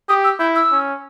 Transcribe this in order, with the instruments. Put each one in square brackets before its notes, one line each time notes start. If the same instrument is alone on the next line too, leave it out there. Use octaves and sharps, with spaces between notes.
[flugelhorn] G4 [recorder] D#6
[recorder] E6
[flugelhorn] E4 [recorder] G6
[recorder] E6
[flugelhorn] C#4